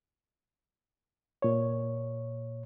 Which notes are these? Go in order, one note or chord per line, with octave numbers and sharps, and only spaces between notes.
A#2 C#5